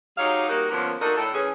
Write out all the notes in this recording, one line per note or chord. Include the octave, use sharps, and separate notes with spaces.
F#3 D#4 G4 G#4 C#5 F5
G3 A#3 D#4 F#4 A#4
D3 F3 A#3 B3 C#4 A#4
A#3 D4 D#4 F#4 A4 A#4
A2 A4
E3 C#4 G#4